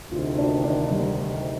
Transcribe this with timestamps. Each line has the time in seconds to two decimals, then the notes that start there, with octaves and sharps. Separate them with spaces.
0.11 D2 C3 D#3 F4
0.38 D4
0.64 D4
0.91 G3